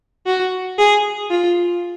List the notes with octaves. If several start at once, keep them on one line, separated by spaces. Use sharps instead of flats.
F#4
G#4
F4